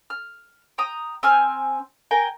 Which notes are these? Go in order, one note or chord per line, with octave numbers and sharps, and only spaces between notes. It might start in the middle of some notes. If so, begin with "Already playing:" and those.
F6
G5 A#5 D#6
C4 G#5 F6 G6
A#4 G5 G#5 A#5